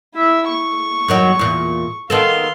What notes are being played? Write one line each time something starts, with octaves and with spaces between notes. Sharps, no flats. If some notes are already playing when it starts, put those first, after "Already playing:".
E4 E5
C#6
F#2 D#3 F#3
E2 A#2
D#3 B3 A4 F5 C6